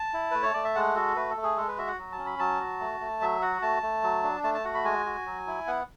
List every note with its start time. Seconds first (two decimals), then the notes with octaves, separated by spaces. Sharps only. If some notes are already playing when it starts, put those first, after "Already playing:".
Already playing: A5
0.13 E4
0.31 A3 B4
0.42 C#5
0.54 A3 D5
0.64 E5
0.75 G#3 F#5
0.95 F#4 A4
1.16 A3 B4
1.30 A4
1.37 A3
1.43 G#4
1.57 G#3 A4
1.68 B4
1.78 F#4 E5
1.88 F#5
1.98 F#3
2.12 A5
2.18 C#4
2.26 B5
2.39 F#3 A5
2.60 F#4
2.80 A3
3.00 A3
3.21 F#3 E5
3.42 F#4 F#5
3.62 A3 A5
3.82 A3
4.03 F#3
4.23 D4
4.44 A3 A5
4.54 A5
4.64 F#4 F#5
4.74 B5
4.84 G#3 G#5
5.06 F#4
5.26 F#3
5.47 E4
5.67 B3 F#5